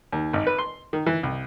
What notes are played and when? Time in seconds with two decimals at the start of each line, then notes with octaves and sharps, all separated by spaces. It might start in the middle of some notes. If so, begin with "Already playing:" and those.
0.12 D#2
0.33 G#1
0.47 B4
0.59 C6
0.93 D#3
1.06 E3
1.23 C2